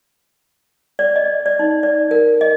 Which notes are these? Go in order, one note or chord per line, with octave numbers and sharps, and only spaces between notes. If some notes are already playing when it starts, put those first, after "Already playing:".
D5
D#5
D5
D#4
D5
A#4
D#5